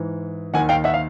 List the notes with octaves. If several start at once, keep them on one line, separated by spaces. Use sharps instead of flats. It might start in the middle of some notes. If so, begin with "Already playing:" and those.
Already playing: G#2 E3
D#2 D#3 F#5 G#5
F5 G5
E5 F#5
F5